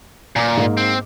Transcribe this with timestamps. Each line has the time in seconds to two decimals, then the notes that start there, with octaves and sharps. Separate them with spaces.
0.36 A#2 G#5 A#5 D6
0.57 G#2 A#3
0.77 C4